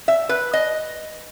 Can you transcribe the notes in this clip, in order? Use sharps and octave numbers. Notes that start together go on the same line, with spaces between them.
E5
B4
D#5